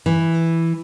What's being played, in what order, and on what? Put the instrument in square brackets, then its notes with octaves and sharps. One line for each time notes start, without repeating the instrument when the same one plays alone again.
[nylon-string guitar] E3